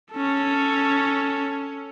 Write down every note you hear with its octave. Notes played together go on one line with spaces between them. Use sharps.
C#4 A4